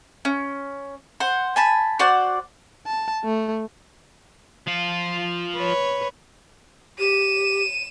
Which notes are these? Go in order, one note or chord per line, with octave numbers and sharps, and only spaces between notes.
C#4
C5 F#5
G#5 A5 B5
F#4 C5 D5 F#5
A5
A3
F3 F4
B4 C#5
G4 D#7 E7